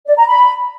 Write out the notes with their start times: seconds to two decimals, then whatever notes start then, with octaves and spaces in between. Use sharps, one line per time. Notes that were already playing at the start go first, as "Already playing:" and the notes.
0.07 D5
0.17 A#5
0.28 B5